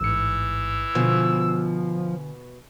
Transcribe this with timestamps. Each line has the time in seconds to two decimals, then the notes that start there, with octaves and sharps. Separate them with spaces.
0.01 A1 G#2 E3 E6 C#7
0.95 B2 D3 F3 G#5